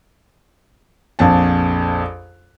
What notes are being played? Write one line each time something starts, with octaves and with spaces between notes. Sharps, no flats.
A#1 F2 A5